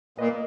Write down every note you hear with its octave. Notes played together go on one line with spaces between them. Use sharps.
A#2 B4 D#5